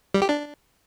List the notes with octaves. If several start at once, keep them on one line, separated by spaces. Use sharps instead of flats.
G3
G4
D4